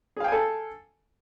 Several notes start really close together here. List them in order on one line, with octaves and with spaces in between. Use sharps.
G#4 F5 G5 G#5 A4